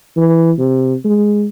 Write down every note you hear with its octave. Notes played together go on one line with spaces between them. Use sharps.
E3
C3
G#3